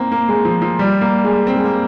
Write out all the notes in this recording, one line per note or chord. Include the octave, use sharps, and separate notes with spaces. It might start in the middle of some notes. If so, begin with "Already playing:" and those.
Already playing: A#3 C4
A#3
G#3
F3
F3
G3
A#3
G#3
C4
G#3
A#3